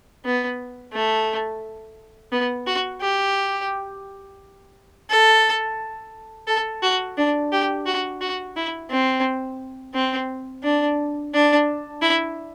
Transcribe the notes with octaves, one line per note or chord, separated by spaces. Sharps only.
B3
A3
B3
F#4
G4
A4
A4
F#4
D4
G4
F#4
F#4
E4
C4
C4
D4
D4
E4